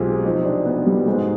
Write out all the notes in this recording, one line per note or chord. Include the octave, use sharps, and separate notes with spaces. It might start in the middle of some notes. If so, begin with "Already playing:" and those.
Already playing: B1 B2 G#3 C4 F4 G4
C3 F3 C4 D#4
D4
B3
G3
G#2 G3 G#3 C4 D#4